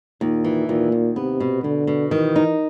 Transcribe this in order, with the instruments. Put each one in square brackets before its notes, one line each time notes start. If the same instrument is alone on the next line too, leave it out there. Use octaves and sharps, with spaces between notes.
[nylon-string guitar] D#2 [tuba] A#2
[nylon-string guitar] E3
[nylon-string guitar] D#2 [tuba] A#2
[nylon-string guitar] D#2
[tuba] C3 [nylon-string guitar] B3
[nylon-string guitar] B2
[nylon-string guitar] B2 [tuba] D3
[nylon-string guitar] B2
[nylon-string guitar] D#3 [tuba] E3
[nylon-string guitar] D#4